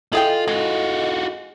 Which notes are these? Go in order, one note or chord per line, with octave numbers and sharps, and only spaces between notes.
E4 F4 G#4 A4 D#5 G5 F#7
G#3 F4 F#4